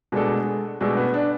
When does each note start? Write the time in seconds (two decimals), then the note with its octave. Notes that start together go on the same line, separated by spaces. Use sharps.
0.12 B2 G#3 A3 D4 A4
0.81 B2 G#3 A3 D4 A4
0.97 B3
1.14 D4